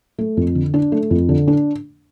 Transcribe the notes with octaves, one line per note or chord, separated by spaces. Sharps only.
A3
F2
D3
D4
A3
F2
D3
D4